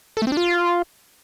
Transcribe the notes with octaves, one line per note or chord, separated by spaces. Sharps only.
A4
A3
C4
D4
F4